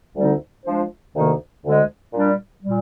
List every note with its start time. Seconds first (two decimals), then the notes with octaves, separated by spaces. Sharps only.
0.17 D2 D3 G3 C4 D#4
0.65 F3 G#3 D4 F4 C5
1.15 D2 C3 D#3 A#3 D#4
1.63 D2 D3 G#3
2.14 A#2 G3 D4
2.63 A#2 G3